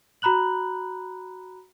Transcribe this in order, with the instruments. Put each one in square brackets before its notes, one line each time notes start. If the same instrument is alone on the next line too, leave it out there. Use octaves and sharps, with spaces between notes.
[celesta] F#4 A#5 B5 F#6 F#7